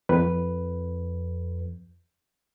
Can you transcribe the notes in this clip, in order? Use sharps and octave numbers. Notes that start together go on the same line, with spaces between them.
F2 B4